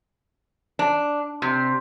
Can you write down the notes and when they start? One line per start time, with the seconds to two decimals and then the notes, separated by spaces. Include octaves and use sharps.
0.79 D4
1.42 C3